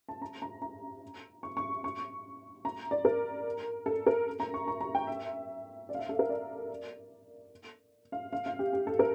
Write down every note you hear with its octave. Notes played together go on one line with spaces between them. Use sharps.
A5
A#5
A#5
A#5
C#6
C#6
C#6
A#5
D5
A#4
A4
A#4
A#5
C#6
A#5
A#5
G5
E5
D5
F5
E5
A4
A#4
D5
F5
F5
F5
G4
G4
A4
A#4